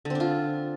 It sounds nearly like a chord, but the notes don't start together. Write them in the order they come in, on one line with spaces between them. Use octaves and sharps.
D3 C4 D4 F4